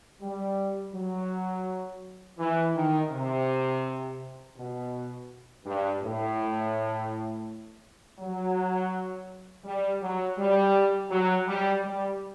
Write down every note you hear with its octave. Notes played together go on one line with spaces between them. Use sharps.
G3
F#3
E3
D#3
C3
B2
G2
A2
F#3
G3
F#3
G3
F#3
G3
G3